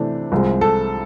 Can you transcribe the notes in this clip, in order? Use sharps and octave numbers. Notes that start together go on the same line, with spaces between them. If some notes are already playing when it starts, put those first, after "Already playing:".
Already playing: C3 E3 A3 D4
C2 C3 F3 G#3
A4